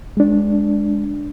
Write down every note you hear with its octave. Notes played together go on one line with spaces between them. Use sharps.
G#3 D4